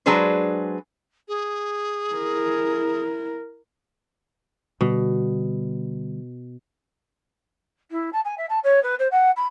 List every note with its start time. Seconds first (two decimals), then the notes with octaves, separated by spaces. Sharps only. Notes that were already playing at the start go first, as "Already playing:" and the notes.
0.06 F#3 G#3 D4 G#4 B4 C5
1.28 G#4
2.13 E4 A#4
4.81 B2 D3 G3 B3
7.91 E4
8.12 A5
8.25 G#5
8.38 E5
8.49 A5
8.64 C#5
8.83 B4
8.99 C5
9.11 F#5
9.36 B5